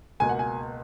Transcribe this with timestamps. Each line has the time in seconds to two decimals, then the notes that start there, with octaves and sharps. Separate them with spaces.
0.20 C#2 B2 A#3 G#5
0.29 F#5
0.39 G#5